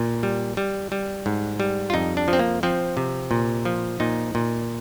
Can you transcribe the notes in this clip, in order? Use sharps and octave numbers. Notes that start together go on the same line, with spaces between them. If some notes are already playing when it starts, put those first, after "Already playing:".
Already playing: A#2
G3
G3
G3
G#2
G3
F4
F2 D#4
D4
F3
C4
A#3
F3 C4
C3
A#2
F3
A#2 D#4
A#2